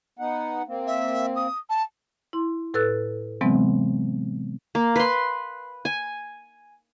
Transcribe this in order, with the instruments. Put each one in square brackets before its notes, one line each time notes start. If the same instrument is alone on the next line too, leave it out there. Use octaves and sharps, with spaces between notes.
[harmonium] B3 D#4 F#5
A#3 C4
[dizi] E5
D#6
A5
[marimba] E4 C6
A2 A4 B4 E6 F#6 A6
C3 E3 F#3 G#3 B3 C4
[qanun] A#3
B4 C6
G#5